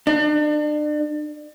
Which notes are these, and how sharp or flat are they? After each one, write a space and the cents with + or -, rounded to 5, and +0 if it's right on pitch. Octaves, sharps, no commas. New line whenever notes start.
D4 +35